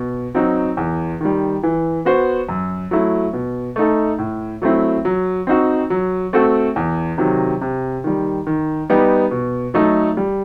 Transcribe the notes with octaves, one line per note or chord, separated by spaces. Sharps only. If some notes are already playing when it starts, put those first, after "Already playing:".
Already playing: B2
F#3 C4 D#4 F#4
E2
D#3 G3
E3
B3 F#4 C5
F#2
F#3 A3 E4
B2
A3 D#4 A4
A2
F#3 A3 C4 E4
F#3
C4 D#4 F#4
F#3
A3 C4 F#4 A4
E2
C3 D#3 F#3
C3
D#3 G3
D#3
G3 B3 D#4 G4
B2
F#3 A3 D#4 A4
G3